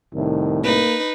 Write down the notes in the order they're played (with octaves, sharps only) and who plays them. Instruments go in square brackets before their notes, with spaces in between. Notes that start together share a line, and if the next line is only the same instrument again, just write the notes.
[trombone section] C2 A2 [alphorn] D#3
[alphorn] A#3 [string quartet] D#4 B4